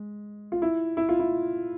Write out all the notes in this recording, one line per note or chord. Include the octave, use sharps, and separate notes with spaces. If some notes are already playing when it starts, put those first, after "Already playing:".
Already playing: G#3
F4
E4
E4
F4
E4